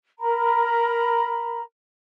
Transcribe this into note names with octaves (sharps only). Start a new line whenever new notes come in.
A#4 A#5 B5